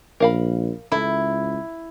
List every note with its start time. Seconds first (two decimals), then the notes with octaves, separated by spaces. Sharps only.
0.20 A#1 A#4 F5 B5
0.92 C#2 E4 A4